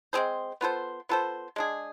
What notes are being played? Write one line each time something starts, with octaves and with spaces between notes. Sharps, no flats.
G#3 C4 G#4 C5
B3 F4 A4 C5
B3 F4 A4 C5
G#3 D4 G#4